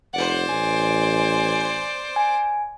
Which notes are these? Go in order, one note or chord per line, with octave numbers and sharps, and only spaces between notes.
F1 C5 D5 F#5
A1 G#5
G#5